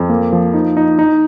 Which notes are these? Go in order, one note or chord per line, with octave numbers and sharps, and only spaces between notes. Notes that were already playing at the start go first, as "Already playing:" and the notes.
Already playing: F2
A#3
F3
D#4
D#4
D#4